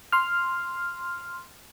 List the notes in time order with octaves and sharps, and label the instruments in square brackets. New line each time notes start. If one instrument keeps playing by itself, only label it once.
[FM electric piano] C6 F6